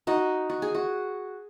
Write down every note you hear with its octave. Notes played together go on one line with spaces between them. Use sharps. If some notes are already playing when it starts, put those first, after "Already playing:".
D#4 F#4
F#4
G#4
F#4